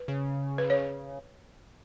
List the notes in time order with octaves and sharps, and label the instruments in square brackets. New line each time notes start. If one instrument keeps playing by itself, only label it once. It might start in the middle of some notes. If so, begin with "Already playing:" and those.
Already playing: [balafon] B4
[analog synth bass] C#3
[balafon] B4
C#5